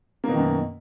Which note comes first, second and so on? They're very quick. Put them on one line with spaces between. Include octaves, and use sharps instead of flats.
A#3 B2 D#3 F#2